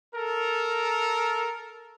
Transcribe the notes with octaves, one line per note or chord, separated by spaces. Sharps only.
A4 A#4